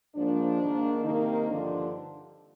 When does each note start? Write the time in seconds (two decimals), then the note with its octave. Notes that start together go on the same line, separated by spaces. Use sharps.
0.14 G#2 F3 A#3 D4
0.58 G#2 D#3 A#3
1.02 C3 D#3 A#3 D#4
1.46 G2 D3 F3 D4